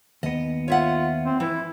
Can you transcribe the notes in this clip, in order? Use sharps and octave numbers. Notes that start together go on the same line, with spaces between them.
D#2 B3 D#5
F4 C#5 E5 F#5
C4
E3 E4